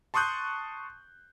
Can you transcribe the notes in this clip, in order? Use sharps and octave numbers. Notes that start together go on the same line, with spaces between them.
A5 C6 C#6 D#6 F#6 G6